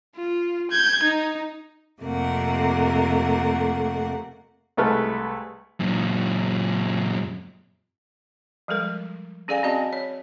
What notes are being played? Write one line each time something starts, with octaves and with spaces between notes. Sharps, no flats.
F4
G6 G#6
D#4
F2 C3 A3 A#3 F#5
C2 G#3 A3 B4 F6
F#2 A#2
F3 G3 G#3 A4 A#4
C#4 G#4 A4 D5 F5 G#5
C4 C#4 F#4 D#5 G#5 A5
C#5